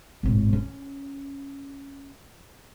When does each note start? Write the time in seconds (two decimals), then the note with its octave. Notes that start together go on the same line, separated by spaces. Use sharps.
0.23 G#1 A2
0.53 C#4